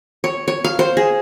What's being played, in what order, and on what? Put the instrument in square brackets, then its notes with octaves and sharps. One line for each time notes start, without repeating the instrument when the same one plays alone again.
[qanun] C#5
C#5
F5
C5
G#4